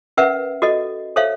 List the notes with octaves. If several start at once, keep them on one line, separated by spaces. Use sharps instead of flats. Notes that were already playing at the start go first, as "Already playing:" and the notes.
C#4 A#4 B4 E5 F#5
F#4 A4 D#5
A4 C5 C#5 E5 F5